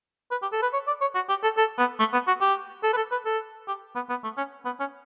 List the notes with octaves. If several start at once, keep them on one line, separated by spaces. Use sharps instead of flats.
B4
G4
A4
B4
C#5
D5
C#5
F#4
G4
A4
A4
B3
A3
B3
F#4
G4
A4
B4
A4
B4
A4
G4
B3
B3
A3
C#4
B3
C#4